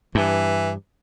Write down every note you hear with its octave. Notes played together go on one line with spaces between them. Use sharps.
G2 E3